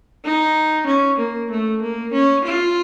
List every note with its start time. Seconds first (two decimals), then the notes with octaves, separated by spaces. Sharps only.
0.24 D#4
0.87 C#4
1.18 A#3
1.51 A3
1.81 A#3
2.13 C#4
2.44 F4